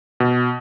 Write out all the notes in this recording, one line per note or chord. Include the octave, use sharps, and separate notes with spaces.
B2